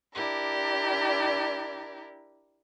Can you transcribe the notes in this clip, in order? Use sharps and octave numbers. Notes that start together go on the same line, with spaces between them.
D4 E4 G4 A#4